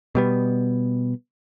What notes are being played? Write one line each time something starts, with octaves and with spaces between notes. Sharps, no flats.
B2 G3 B3